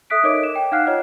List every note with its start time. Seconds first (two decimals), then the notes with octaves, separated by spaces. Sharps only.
0.10 A4 E5 D#6 F#6 B6 D7
0.23 D#4 A#4 C#5 D#5 D6 D7
0.43 E7
0.55 G5
0.72 D#4 F5 F#5 F6 F#6 C7
0.87 F4 C#5 D#5 F6